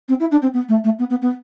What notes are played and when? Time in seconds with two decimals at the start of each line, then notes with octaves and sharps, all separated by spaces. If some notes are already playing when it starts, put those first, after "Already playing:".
0.08 C4
0.20 E4
0.31 D4
0.42 C4
0.53 B3
0.68 A3
0.84 A3
0.98 B3
1.10 B3
1.21 B3